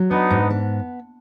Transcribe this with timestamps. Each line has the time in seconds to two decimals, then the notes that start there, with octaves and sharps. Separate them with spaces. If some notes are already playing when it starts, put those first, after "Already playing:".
Already playing: F#3
0.10 B3 D4 D#4
0.30 G#2
0.50 B3